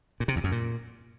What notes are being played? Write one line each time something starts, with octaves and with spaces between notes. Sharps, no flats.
A#2
C3
E2
F#2
A#2